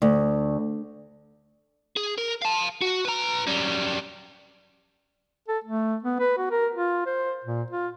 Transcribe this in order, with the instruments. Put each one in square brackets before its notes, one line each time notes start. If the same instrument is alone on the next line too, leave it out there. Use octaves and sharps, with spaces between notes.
[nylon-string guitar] D2
[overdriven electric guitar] G#4
A#4
F5 A5
F#4
B4 A#5
F#2 G3
[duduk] A4
A3
B3
B4
F#4
A#4
F4
C5
A#2
F4